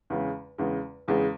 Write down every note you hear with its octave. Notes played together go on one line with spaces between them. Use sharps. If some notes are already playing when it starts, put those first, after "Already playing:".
E2 C#3 G#3
E2 C#3 G#3
E2 C#3 G#3